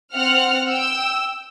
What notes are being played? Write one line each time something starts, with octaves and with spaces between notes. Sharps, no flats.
C4 F#5 F6
G5 E6